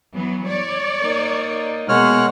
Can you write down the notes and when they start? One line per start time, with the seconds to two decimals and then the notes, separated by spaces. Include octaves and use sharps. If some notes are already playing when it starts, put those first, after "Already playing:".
0.14 E3 F#3 B3
0.47 C#5 D5
1.02 A#3 D#4
1.89 B2 G#3 A#3 C#5 F#5 F6